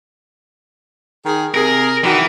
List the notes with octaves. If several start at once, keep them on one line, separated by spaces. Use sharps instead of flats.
D#3 G#4
C3 G#4 A#4
D#3 E3 D4 F#4